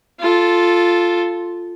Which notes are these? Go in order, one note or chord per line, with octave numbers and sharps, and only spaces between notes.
F4 A4